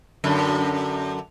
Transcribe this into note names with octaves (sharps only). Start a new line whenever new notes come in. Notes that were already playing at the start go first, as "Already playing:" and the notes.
F#2 D3